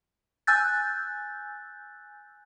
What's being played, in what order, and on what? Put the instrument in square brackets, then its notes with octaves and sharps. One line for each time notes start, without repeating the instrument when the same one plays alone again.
[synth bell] G#5 E6 F#6 G6 A6